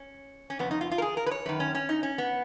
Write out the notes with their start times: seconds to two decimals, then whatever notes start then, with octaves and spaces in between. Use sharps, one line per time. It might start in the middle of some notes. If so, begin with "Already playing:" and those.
Already playing: C#4
0.50 C#4
0.59 F2 C#3 B3
0.71 D#4
0.81 F4
0.91 F4
0.98 A#4
1.02 G#4
1.17 A#4
1.26 B4
1.31 C#5
1.46 F#2 D#3 B4
1.60 C#4
1.75 C#4
1.89 D#4
2.03 C#4
2.18 B3